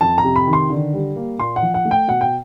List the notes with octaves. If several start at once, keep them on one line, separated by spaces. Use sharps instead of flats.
F2 A5
A#5
C3
B5
D#3
C6
D3
G3
A#3
A#2 C6
F#5
F3
F#5
A3
G5
B2 F#5
G5